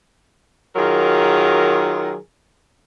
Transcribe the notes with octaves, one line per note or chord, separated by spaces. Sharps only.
D#3 F#3 F4 G#4 A#4